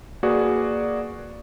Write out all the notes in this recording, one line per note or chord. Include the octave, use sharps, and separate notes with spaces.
A#3 F#4 G#4 B4 D5